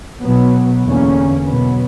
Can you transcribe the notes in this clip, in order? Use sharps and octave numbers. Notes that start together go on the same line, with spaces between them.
B2 F#3 B3
E2 D3 A#3 C#4
B2 F#3 B3